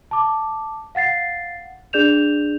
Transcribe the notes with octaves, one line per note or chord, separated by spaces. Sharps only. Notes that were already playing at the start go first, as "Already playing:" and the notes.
A5 D6
F5 F#5 A6 C7
D4 G#4 D5 G6 E7 F7